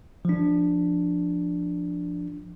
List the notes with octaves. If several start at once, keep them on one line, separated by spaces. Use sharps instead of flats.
F3 D4